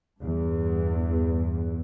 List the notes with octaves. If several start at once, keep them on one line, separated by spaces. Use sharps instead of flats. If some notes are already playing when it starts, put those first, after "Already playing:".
E2 G2